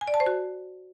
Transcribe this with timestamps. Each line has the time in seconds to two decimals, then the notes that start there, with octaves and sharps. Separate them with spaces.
0.01 G#5
0.08 D5
0.14 A5
0.20 C5
0.26 F#4